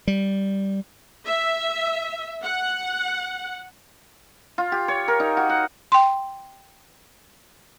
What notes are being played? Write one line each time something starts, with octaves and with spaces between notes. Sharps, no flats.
G3
E5
F#5
F4
G4
C#5
A#4
D#4
F#4
F#5
G5 C6